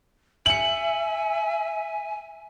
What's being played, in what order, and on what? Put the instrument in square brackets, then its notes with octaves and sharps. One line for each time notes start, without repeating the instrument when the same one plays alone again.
[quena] E5 [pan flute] G#5 [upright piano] C#7 F#7